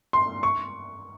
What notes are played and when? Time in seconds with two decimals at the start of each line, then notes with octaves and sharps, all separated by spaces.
0.13 C6
0.43 C#6